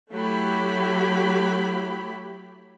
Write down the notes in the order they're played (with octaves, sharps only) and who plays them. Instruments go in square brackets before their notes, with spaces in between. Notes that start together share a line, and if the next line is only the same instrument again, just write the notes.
[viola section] F#3 A3 E4 G4 B5